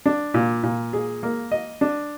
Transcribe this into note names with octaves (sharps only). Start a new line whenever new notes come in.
D4
A#2
A#2
G#4
A#3
D#5
D4